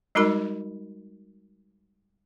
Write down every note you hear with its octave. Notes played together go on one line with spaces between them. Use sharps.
G3 G#3 D#4 F#4 A#4 B5